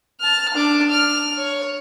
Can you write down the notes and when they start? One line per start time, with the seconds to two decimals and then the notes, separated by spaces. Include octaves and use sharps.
0.20 A5 F6
0.54 D4 D6
0.90 F6
1.38 C#5